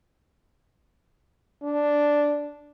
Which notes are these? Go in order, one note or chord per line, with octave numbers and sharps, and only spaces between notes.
D4